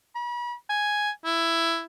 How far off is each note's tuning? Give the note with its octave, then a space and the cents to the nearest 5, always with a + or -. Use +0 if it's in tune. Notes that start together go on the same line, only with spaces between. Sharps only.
B5 -40
G#5 +0
E4 +10